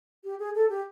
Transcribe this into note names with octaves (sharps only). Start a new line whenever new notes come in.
G4
G#4
A4
G4